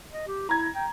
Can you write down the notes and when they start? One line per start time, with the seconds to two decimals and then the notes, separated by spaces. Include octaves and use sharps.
0.13 D#5
0.28 G4
0.49 E4 A#5 G#6
0.75 G5